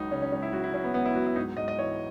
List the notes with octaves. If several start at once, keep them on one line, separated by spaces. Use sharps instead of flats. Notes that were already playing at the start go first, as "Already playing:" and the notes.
Already playing: C#2 F#3 D#4
C#3 C#4
C#4
C#2 C#4
E4
F#3 F#4
E4
F#3 C#4
B3
C#2 B3
E4
F#3 F#4
E4
G#2 D#4
G#2 D#5
D#5
E3 C#5